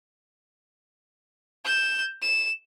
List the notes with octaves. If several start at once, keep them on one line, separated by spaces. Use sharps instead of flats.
G6 E7
E7